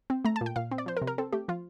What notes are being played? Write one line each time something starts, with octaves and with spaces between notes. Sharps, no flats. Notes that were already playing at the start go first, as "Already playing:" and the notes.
C4
A3 A#5
A5
A#2
G5
A#2 F5
C4
D5
F3 C5
A#4
C3
A#4
C4 A4
A3 G4
F3 F4